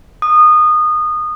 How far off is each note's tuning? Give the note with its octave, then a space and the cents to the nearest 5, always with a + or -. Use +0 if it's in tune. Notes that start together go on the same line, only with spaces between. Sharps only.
D#6 -20